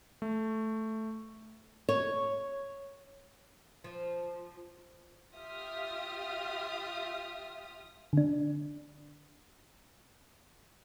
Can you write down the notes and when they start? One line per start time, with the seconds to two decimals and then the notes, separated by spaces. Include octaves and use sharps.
0.22 A3
1.89 C#5
3.84 F3
5.36 F4 G4 E5 D#6 F6
8.13 D3 D4